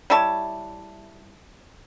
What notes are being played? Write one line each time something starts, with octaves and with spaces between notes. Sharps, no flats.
G3 E4 C#5 A5